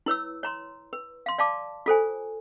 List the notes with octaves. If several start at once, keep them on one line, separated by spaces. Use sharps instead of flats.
E4 B4 C#5 E6
C#5 A#5 C6
B4
F5 C6
D5 F5 A5 D6
F4 A4 C5 G#5